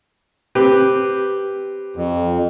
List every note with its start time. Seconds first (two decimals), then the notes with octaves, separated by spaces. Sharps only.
0.55 C4 G4 B4
1.96 F2